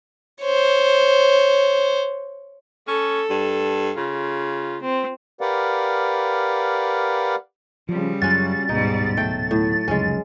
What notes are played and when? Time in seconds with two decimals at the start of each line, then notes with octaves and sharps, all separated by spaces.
0.42 C5 C#5
2.88 C#4 A4
3.30 G2
3.97 C#3 F4
4.82 C4
5.41 G4 A#4 B4 D5 F5 F#5
7.89 C#3 F3 G3
8.22 F#2 F#3 C#4 F4 F#4 A6
8.69 D1 G#2 B2 G3 D#4
9.17 F#3 A3 A4 G5
9.51 A2
9.88 F1 C#2 F#2 G#3 C#4